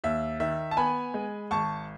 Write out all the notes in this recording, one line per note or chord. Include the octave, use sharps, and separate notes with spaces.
D#2 E5
D#3 E5
A5
B3 G#5 B5
G#3
G#1 A5 C#6